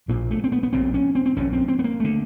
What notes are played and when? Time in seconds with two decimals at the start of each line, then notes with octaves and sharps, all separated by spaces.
0.08 A#1 A#2 A#3
0.31 A3
0.44 C4
0.52 B3
0.63 B3
0.73 A#1 A#2 C4
0.94 C#4
1.15 C4
1.26 C4
1.37 A#1 A#2 C#4
1.53 C4
1.68 C4
1.79 B3
1.84 A#3
2.00 D3 A3